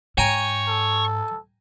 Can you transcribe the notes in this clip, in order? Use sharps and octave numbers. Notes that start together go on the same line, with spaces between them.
G#2 C#5 G5 G#5 A#5
A4